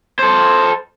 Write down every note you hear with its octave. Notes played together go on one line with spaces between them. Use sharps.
A4 C5